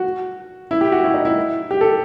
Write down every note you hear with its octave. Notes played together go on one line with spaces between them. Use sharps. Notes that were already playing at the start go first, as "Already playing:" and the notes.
Already playing: F#4
E4
G4
F#4
E4
D#4
E4
G4
A4